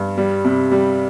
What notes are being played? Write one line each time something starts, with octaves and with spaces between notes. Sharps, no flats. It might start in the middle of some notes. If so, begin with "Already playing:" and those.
Already playing: G2
G3
C3
G3